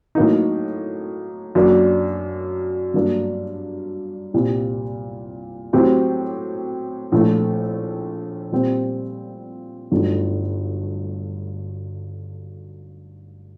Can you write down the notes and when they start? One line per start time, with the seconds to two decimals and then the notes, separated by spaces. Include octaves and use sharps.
0.15 A2 F#3 A#3 D#4
1.55 F#2 F#3 A#3 D4
2.94 G2 F#3 A#3 D4
4.34 C2 A#2 G3 C4
5.73 A2 F#3 C4 G4
7.12 A#1 A2 A3
8.52 A#2 G3 C4
9.91 G1 G2 F#3 A3 D#4